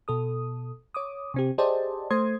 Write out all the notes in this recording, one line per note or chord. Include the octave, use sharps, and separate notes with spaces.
B2 A4 D#6
C#5 D6 D#6
C3 C4 G4
G4 G#4 C5 D5 D#5 A5
A3 C5 C6 D#6 G#6